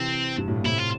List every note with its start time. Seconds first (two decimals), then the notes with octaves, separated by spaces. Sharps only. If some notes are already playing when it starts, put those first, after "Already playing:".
Already playing: C3 E3 C4
0.38 G2
0.48 A2
0.56 A#2
0.65 A2 C3 E4
0.78 F4